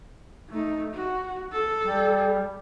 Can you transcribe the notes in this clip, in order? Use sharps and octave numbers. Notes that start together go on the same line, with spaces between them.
A3 D#4
F#4
A4
G3